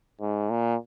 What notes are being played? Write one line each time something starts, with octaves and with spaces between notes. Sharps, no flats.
G#2
A#2